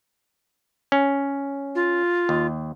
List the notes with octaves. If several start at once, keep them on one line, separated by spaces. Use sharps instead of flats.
C#4
F4
D#2